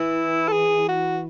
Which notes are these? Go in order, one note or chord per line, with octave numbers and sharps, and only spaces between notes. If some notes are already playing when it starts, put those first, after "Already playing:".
Already playing: E3 E4
A4
G#4
F#4